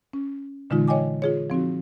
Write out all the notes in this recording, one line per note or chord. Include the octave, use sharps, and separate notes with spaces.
C#4
A#2 D3 E3 G#3 D#4 F4
C#5 D#5 G5 G#5 D6
F4 G#4 C#5
F3 C4 D#4 F#4